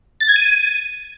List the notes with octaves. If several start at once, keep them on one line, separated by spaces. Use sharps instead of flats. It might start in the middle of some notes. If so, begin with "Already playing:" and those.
A6
G#6
D#7